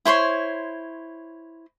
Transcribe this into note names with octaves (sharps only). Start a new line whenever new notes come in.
E4 C5 C#5 C6